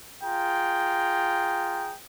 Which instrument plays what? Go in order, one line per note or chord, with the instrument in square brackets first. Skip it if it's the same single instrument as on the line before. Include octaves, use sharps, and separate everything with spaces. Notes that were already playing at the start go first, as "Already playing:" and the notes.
[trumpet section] F4 G#4 G5 A#5